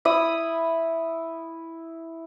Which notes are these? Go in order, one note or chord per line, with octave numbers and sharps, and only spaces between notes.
E4 B5 D#6